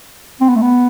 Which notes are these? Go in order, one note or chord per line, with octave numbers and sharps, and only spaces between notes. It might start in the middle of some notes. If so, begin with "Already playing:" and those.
C4
B3
A3
B3